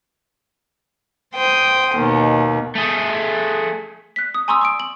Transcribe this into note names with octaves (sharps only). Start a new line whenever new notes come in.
C5 G5 D#6
D#2 B2
A3 G#4
F#6 B6
D#6
G#5 A#5 C6 C#6 D#6 E6
C#6 D#6 D7
F#7